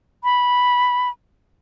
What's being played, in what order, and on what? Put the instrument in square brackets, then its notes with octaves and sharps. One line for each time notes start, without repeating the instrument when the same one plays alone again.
[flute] B5